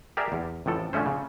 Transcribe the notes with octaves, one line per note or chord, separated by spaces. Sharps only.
G4 G#4 A#4 D5 E5
E2
A1 F2 A2 A4
D3 F3 A3 C#4 C5
C#3